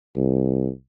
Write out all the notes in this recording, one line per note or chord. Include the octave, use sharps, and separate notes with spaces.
C2